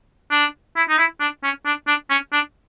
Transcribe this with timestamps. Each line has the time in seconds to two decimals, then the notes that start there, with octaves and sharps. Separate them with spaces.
0.31 D4
0.76 E4
0.89 D#4
0.98 E4
1.20 D4
1.44 C#4
1.65 D4
1.87 D4
2.10 C#4
2.32 D4